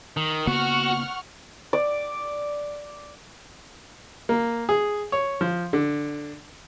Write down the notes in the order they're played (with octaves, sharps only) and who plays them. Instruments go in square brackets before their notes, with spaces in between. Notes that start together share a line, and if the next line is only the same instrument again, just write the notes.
[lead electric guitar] D#3
[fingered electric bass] C#3 A#3 B3 [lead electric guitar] F#4 [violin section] F#5 C#6 F6
[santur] D5
[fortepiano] A#3
G#4
C#5
F3
D3